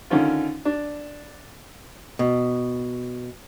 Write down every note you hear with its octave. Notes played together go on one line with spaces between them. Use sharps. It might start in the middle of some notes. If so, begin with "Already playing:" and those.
D3 D#3 C#4 F4
D4
B2